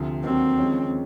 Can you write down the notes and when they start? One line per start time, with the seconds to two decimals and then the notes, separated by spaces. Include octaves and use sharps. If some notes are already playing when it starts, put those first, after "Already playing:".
Already playing: D2 C3 F3
0.24 D#2 D3 F#3 C4
0.58 D#2 C#3 F3 G#3 C#4